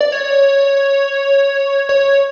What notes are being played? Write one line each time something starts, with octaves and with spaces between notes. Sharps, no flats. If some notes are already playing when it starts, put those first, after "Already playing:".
D5
C#5
C#5